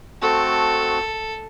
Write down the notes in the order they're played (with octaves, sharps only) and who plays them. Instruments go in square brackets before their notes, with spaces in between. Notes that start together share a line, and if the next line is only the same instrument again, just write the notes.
[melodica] A3 C4 F#4 [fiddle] A4